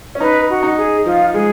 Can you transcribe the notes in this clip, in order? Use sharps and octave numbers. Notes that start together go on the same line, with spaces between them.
C#4
D#4 B4
F#4
D#4
G#4
F3 F4
G#3 G#4